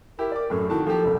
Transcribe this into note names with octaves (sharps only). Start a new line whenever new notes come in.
E4 G4 A#4
D5 D6
F#2 A2 A4
D#3 E4 F#4 A5
F3 A#3 G4 A4
F#1 C2